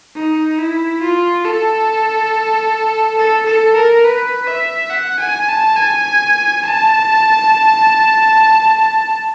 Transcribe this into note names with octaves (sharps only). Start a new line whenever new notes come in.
D#4
E4
F4
A4
A4
A4
A#4
B4
E5
F#5
G#5
A5
G#5
A5